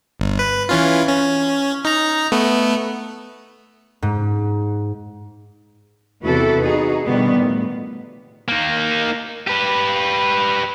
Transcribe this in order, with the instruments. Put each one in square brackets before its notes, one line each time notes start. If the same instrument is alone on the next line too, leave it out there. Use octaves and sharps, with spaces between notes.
[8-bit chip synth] G1
B4
E3 C#4 F4
C#4
D#4 A#5
A3 B3
[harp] G#2
[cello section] E2 C3 E4 F#4 A4 B4
D#4 F#4 G#4
B2 D3 D#3 F3 G3 B3
A2
[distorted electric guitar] A#3 D#4
G4 B4